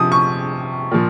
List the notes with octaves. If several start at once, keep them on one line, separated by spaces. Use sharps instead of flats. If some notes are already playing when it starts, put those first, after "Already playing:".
Already playing: C3 F3 D#6
C#6
A#2 F3